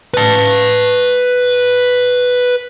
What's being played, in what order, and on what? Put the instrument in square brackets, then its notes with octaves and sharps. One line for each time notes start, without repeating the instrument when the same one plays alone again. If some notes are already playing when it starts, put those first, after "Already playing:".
[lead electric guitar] B4 A5